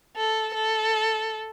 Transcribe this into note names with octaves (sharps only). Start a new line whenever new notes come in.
A4
A4